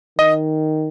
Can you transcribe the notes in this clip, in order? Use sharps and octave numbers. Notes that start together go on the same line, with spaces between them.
D#3 D#5